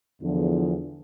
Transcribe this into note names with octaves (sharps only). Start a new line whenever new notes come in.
E2 D3 F3